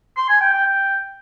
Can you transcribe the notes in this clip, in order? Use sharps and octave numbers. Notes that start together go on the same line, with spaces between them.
C6
G#5
G5
G5
G5